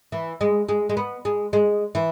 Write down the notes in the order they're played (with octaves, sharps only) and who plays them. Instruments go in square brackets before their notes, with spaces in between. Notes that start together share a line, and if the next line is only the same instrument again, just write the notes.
[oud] E3
G#3
G#3
G#3
B3
G#3
G#3
E3